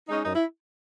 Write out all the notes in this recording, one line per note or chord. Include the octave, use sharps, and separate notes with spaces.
G#3 C#4 D#4
F#2 D#4
E4